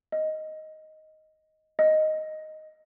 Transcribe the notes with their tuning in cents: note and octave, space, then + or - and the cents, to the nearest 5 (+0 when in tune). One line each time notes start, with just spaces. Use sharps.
D#5 +5
D#5 +0